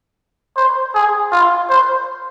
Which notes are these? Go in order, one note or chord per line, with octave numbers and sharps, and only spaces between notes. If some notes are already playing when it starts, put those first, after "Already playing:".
C5
G#4
F4
C5